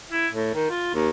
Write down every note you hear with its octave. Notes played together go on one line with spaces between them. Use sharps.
E4
A2
D#3
F4
D#2